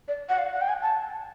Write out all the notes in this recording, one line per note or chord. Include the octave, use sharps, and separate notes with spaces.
D5
F#5
F5
F#5
G5
G#5
A5